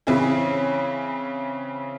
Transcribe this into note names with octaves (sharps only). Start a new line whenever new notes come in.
C#3 E3 C4 C#4 E4 G#4